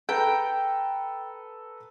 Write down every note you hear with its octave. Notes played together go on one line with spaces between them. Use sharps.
A4 B4 G5 A#5